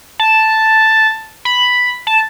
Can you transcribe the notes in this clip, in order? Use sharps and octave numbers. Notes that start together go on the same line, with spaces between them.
A5
B5
A5